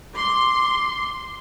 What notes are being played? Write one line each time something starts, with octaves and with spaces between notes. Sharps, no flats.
C6 D6